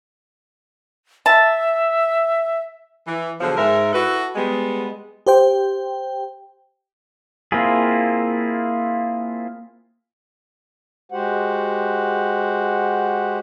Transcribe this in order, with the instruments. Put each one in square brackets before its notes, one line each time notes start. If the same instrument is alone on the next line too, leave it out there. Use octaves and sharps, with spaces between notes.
[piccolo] E5 [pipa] A5
[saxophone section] E3
B2 D3 F3 F#3 G#4 C5
G#2 A#4 E5
E4 F#4 A4 B4
G3 G#3 B3
[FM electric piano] G4 C5 G5
[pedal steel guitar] A#3 C4 E4 F4 G#4
[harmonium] G#3 F#4 G4 C5 F#5